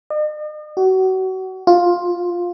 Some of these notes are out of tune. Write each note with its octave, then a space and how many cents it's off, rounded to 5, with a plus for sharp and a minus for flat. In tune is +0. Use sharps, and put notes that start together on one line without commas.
D#5 -45
F#4 +30
F4 +10